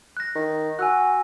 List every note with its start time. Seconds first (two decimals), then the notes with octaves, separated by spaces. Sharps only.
0.17 F#6 A#6
0.35 D#3
0.79 F#4 G#5 E6 F#6